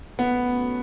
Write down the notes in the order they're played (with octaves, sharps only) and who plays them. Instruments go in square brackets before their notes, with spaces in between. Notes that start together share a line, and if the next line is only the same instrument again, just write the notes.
[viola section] A3 C#4 F#4 [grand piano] B3